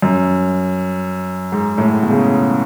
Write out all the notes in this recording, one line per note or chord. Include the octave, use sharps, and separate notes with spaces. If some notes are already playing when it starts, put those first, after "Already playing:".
F#2
G#2
A2
B2
C#3